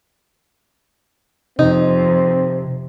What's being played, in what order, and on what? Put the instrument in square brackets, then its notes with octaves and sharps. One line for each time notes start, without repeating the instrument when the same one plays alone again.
[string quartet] F2 [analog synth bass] C3 [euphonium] C4 [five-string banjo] D#4